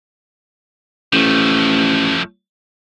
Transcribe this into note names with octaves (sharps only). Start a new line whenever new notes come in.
A1 F3 A3